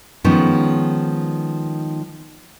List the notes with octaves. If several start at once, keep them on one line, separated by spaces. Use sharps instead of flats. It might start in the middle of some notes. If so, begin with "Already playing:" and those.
D#3 F3 G#3 B3 C#4 D#4